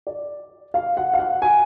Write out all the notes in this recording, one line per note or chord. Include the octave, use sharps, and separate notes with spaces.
D5
F5
F#5
F5
F#5
G#5